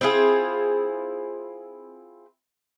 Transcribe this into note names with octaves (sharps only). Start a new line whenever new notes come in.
C4 E4 F4 G#4